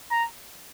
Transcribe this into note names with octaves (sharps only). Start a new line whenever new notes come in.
A#5